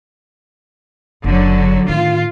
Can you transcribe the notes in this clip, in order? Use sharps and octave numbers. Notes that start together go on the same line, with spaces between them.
F#1 D3 F#3
A2 D#3 F4